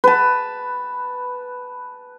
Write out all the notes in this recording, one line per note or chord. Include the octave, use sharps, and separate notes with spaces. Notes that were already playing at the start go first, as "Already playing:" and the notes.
B4 A5